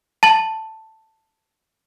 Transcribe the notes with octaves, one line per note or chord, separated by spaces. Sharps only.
A5 A6 F#7